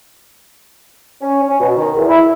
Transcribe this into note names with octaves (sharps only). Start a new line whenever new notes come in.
C#4
C#4
B2
D#3
E2
E4